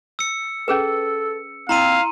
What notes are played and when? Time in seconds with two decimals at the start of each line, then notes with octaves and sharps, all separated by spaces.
0.19 E6 C#7
0.68 C#4 G#4 A4 B4
1.69 C4 E4 F5 A#5 C6 D#7